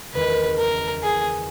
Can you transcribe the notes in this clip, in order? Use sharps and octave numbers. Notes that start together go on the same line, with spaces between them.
F#1 E2 D#3 G#3 D#4 B4
A#4
G#4